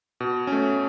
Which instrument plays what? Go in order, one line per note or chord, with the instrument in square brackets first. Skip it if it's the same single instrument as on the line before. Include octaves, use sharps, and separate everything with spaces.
[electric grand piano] B2
A3 C#4